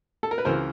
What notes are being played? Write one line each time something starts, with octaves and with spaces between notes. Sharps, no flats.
A4
A#4
B4
C#2 C#3 E3 A#4 C5